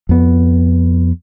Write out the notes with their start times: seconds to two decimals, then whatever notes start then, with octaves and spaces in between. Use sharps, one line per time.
0.09 F2 B3